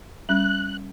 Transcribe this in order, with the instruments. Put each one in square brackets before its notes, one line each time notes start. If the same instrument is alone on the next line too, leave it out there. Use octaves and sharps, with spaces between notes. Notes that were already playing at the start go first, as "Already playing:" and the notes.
[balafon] G3 C#4 [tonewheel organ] F#6